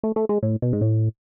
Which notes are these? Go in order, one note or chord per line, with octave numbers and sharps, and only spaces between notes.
A3
A3
G#3
A2
B2
G#2
A2